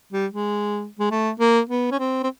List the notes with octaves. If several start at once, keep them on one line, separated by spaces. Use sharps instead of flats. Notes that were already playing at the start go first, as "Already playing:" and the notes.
G3
G#3
G#3
A3
A#3
B3
C#4
C4
C4